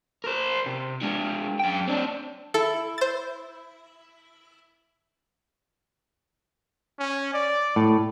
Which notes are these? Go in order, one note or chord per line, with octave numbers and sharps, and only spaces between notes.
A#4 C5
C3
G#3 D4
F#2 G5
C4 D4
E4 A4
C5 A6
C#4
D5
A2